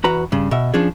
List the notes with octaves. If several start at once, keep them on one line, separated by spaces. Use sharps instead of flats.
E2 F#4 B4 A#5 B5
G2 C#3
B2 E5
F3 C#4 D4 G#4